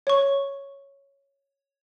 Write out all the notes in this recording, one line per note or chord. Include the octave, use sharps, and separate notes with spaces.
C#5 C#6